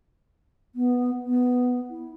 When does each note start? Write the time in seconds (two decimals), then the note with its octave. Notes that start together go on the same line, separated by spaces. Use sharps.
0.75 B3
1.26 B3
1.90 E4